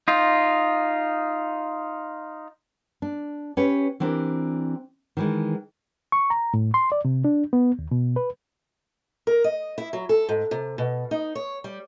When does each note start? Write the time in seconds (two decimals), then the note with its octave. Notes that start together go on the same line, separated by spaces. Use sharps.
0.08 D#4 F4
3.02 D4
3.57 C#4 G4 B4 C#5
4.00 E3 C4 D4 G4 A#4
5.17 D#3 E3 G#3
6.12 C#6
6.30 A#5
6.54 A2
6.74 C6
6.92 D5
7.05 C3
7.25 D4
7.53 B3
7.79 D#2
7.91 B2
8.16 B4
9.27 A#4
9.44 D#5
9.78 E4
9.93 F#3
10.09 A4
10.29 G#2
10.51 C3
10.78 B2
11.11 D#4
11.35 C#5
11.64 G3